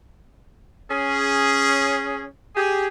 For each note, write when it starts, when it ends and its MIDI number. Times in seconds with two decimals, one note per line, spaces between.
0.90 2.25 61
0.90 2.25 68
2.56 2.87 67
2.56 2.87 68